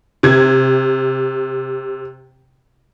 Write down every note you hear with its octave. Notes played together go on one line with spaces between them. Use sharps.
C3 G#6